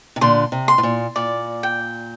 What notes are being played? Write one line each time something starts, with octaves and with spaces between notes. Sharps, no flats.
C3
A#2 D3 C6
C3
C6
A2
A#2
A#2 D5
G5